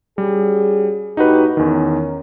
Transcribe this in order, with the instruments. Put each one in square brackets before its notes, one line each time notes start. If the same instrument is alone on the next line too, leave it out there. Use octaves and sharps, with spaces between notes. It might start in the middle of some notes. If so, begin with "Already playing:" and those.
[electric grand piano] G3 [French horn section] C#4 F#4 G#4
[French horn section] A2 G4 [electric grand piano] D#4 F#4 B4
[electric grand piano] E2 D#3 [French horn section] C#4 A#4